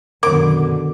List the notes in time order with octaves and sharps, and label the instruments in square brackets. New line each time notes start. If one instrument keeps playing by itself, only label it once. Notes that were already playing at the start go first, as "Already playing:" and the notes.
[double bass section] F#2 B2 D3 [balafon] D#3 A#4 [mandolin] D6